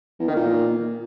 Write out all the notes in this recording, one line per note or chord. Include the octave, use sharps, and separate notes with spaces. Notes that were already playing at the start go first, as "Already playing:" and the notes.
E2
D#3
A#2